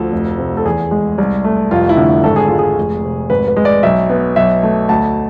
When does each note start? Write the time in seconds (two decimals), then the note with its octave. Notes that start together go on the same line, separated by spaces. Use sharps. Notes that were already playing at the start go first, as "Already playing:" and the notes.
Already playing: D2 F3 A4
0.12 F1
0.38 C3
0.57 A4
0.65 E2 G#4
0.91 G#3
1.18 C2
1.44 A3
1.71 F1 F4
1.89 E4
1.97 D3
2.24 G#1 A4
2.36 G#4
2.48 G#3 F4
2.59 G#4
2.78 F1
3.03 C3
3.30 G#1 B4
3.48 B4
3.56 G#3
3.65 D5
3.83 B1 E5
4.10 B3
4.36 B1 E5
4.63 A3
4.89 D2 A5